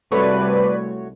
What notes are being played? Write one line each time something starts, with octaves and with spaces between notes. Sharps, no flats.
C2 A3 F#4 B4 C#5 D5